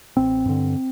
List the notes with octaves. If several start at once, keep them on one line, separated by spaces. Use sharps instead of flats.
A1 C4
G2 D3